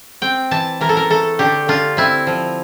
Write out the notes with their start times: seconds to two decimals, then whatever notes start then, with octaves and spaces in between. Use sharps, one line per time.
0.22 C4 G5
0.51 E3 A5
0.81 E3 A#4
0.89 A4
0.97 A#4
1.10 A3 A4
1.39 D3 G4
1.68 D3 F4
1.97 C4 E4
2.27 F3